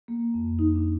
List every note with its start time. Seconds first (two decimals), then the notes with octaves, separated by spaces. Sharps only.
0.08 A#3
0.34 F2
0.59 D#4
0.76 D4